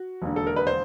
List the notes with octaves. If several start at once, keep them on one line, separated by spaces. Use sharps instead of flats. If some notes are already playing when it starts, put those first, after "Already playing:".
Already playing: F#4
E1 D#2 D3
A4
A#4
B4
C5